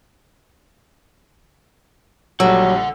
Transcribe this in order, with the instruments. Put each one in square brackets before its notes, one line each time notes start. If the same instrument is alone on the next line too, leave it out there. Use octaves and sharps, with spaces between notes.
[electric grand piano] A#1 G3 E6 [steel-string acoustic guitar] F#3 [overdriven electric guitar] A4 F#5